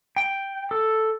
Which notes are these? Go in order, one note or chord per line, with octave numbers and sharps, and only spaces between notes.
G5
A4